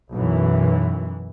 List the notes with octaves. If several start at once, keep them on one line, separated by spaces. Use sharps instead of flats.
B1 F#2 E3